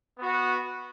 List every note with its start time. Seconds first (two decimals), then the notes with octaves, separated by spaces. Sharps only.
0.19 B3 F#4